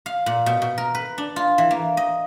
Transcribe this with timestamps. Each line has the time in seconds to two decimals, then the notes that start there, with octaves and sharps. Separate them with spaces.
0.06 F5
0.26 A#2
0.46 B2
0.62 B2
0.78 A#4
0.95 B4
1.18 D4
1.36 F4
1.58 E3
1.71 A#3
1.97 D#5